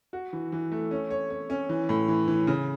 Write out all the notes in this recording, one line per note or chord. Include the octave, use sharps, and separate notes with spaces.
F#4
E3
E3
A3
C#4
C#5
C#5
C#4
E3
A2
E3
E3
C#3